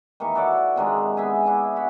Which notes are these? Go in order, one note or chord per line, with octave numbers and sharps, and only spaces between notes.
D#3 E3 A#3 C#6
F#4 A4 D5
C3 D#3 G#3 D4
B3 G#4 E5 G#5
D4 E4
F#4 E5 F#5